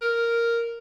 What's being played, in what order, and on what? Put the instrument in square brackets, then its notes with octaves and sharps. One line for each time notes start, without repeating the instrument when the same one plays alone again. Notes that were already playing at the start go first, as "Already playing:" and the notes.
[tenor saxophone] A#4